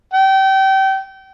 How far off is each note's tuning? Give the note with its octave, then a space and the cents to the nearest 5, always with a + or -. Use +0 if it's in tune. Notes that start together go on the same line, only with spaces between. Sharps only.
G5 -30